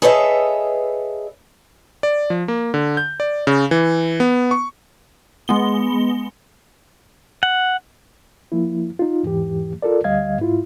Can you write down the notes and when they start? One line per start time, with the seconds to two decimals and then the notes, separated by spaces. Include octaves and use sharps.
0.02 G#4 A4 B4 C#5 D#5 E5
2.03 D5
2.30 F3
2.48 A#3
2.74 D3
2.97 G6
3.20 D5
3.47 C#3
3.71 E3
4.20 B3
4.51 C#6
5.48 G#3 B3 G7
7.43 F#5
8.52 F3 A#3 E4
8.99 D#4 F4
9.23 E2 G#2 E3 G4
9.82 F4 A4 A#4 D5
10.04 D2 D3 G3 D#5 F5 G#6
10.40 G#2 E4 F4